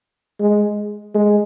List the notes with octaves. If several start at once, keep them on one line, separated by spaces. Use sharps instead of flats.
G#3
G#3